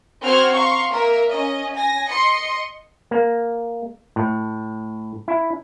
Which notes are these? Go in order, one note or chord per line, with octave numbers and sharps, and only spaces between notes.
C4 F#4 C5 F#5 F6 G#6
F5 A#5 C6 C#6
A#3 A#4 E5
C#4 D#5
G#5 A#6
D#5 C6 C#7
A#3
A2
E4